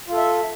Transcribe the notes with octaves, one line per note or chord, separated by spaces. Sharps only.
F4 A4 E5